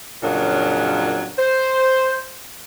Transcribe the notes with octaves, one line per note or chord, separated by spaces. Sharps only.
F2 A#2 C#3 F#3 D4 A#4
C5